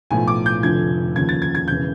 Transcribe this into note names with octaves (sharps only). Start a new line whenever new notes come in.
B1 A2 F3 G#5
D6
G6
F1 F2 D3 F3 G#6
D#2 C#3 F3 G#6
A6
G#6
G#6
E1 C#3 E3 G6